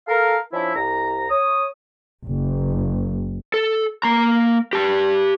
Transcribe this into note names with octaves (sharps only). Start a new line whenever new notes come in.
A4 A#4 F5
F3 C#4 D4 E4
C2 A#5
C#5 D#6
F#1
A4
A#3 A#5
G4 A5